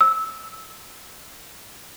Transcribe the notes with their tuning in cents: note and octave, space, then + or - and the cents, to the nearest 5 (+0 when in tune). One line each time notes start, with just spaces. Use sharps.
E6 -15